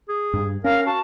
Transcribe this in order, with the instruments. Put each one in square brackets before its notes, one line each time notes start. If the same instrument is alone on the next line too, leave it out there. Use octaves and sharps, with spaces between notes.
[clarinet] G#4
[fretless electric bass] G2
[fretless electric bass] C#4 [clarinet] A#4 [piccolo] F5
[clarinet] F#4 [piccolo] A5